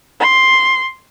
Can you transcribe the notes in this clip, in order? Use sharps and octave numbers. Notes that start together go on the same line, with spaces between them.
C6